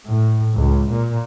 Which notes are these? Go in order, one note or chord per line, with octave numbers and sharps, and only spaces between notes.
A2
C#2
A#2